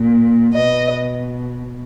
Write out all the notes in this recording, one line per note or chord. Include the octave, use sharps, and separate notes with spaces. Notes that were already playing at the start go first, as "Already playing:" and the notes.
Already playing: A#2
B2 B4 D#5